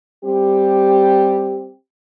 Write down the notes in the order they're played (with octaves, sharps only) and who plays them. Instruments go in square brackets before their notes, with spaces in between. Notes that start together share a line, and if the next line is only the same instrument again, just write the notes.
[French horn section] G3 C4 G4